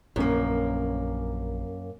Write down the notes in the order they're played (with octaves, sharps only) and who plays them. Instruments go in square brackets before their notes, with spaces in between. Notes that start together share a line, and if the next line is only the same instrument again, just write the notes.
[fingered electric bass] A#1 C#4 [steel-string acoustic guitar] F#2 A#3